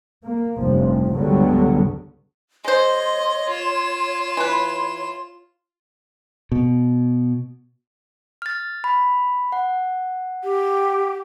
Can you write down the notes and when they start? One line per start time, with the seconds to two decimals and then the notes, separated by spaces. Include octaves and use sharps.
0.24 A#3
0.61 F1 G2 F3
1.13 C#2 G2 D3 F#3 G3 B3
2.64 G#3 C5 C#5 D#5 C6
3.50 F4 E7
4.37 E3 B4
6.52 B2
8.42 F6 A6
8.84 B5
9.52 F#5
10.44 G4